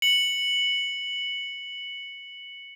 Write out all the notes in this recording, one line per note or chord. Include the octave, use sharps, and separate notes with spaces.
C#7 F#7